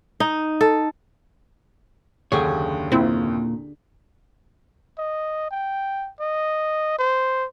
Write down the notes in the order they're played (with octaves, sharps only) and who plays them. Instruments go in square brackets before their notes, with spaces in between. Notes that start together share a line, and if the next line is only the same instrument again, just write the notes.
[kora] D#4
A4
[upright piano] F#1 D#2 [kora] D3 G4 G#4 [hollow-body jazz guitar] C#5
[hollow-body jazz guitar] A#2 [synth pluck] C4 E4
[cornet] D#5
G5
D#5
C5